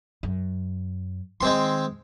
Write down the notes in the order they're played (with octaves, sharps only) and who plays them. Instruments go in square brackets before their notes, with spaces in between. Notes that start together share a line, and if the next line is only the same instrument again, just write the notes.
[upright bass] F#2
[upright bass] D#3 [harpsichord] G#3 C4 C6